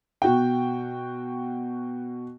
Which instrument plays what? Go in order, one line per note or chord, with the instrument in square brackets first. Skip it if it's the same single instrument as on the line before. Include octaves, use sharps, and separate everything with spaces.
[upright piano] B2 F#4 G5